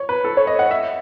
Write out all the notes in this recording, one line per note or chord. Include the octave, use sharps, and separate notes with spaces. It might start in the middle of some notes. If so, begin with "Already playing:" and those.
Already playing: C#5
B4
A4
C#5
D#5
F#5
E5